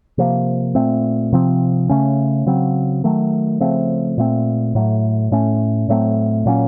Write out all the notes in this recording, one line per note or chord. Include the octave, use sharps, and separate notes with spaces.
C3 F3 A#3
A#2 A3 C4
C3 F3 C4
C#3 A3 C#4
C#3 F#3 C4
D#3 F#3 A3
C#3 F3 A3 C4
A#2 A3 C4
A2 F#3 A3
A2 A3 C#4
A2 F#3 A3 C4
A#2 F#3 A#3 C#4